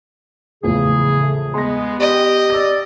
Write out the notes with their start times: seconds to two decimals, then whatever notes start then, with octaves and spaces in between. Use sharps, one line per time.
0.63 A#1 E2 A2 C#3 G#4
1.19 A3
1.54 G#3 B3 C6 A#6
2.00 G4 D#5
2.50 D5 E6 A#6